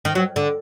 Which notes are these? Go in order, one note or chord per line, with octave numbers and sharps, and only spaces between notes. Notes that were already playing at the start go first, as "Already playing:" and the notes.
D#3
F#3
D3